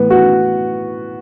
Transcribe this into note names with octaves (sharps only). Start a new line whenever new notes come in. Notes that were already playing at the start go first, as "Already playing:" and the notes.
Already playing: A2 E3 B3
F#4